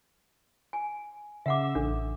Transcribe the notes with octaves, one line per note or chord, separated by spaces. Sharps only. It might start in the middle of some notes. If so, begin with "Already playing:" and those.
G#5
C#3 E5 F#5 D6 E6
A1 D4 A4